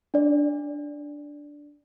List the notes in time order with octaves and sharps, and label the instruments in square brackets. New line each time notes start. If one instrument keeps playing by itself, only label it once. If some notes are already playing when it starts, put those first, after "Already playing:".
[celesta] D4 D5